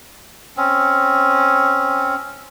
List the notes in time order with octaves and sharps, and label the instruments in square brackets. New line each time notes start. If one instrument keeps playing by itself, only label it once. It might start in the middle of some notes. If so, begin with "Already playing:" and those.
[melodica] C4 C#4